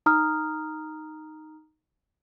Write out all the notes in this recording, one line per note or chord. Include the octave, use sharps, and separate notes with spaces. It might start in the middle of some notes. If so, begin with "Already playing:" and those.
D#4 A#5 D#6 F6